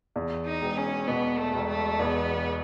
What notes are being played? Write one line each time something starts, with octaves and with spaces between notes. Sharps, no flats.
E2
D#4
E1
C#4
B2 B3
A3
E1
A3
E2 B3